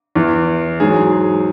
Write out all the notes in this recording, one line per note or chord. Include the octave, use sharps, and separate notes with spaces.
E2 E3
G#2 F#3 G#4
G#4